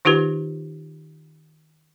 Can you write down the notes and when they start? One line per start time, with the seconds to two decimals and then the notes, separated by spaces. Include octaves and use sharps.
0.05 D#3 D#4 F4 G4 B4